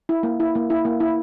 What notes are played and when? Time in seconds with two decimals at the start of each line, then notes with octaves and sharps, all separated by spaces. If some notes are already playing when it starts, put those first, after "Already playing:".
0.09 E4
0.23 A#3
0.40 E4
0.55 A#3
0.70 E4
0.85 A#3
1.00 E4